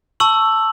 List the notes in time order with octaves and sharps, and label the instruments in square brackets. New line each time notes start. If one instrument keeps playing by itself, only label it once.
[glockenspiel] A5 C#6 E6 F#7